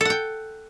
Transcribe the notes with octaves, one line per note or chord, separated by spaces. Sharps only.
A4 F#5 G5